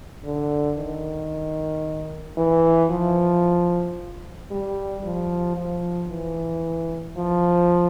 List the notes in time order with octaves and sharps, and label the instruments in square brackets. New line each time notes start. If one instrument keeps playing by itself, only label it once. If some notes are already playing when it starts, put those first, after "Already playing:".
[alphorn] D3
D#3
E3
F3
G3
F3
F3
E3
F3